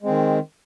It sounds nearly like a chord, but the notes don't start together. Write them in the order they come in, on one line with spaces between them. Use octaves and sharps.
G#3 C4 D#3